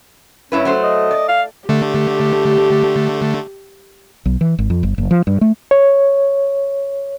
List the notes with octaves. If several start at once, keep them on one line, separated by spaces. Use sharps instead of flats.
G2 C#4 E4 B4
F#3 A3 C5
D#5
D5
F5
D3 A3 G4
B1
E3
G#1
F2
G1
F#1
F3
G2
A3
C#5